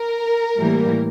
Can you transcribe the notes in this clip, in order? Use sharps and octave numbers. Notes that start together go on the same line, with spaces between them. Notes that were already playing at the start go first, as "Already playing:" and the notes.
Already playing: A#4
A2 E3 G3 A#3